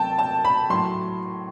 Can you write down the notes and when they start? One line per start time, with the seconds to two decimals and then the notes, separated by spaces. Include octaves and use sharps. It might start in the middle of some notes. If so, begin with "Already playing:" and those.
Already playing: C3 F#3 G5 A5
0.19 A5
0.45 B5
0.70 A2 F#3 C6